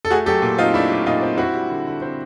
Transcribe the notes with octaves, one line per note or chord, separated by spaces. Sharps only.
A4
A3 F#4 G#4
F#3 G4 A4
A#2
C4 D#4 F4
A3 D4 E4
F#3
A#2 D#4 F4
C4
C4 E4 F#4
G3
D3
D3
C4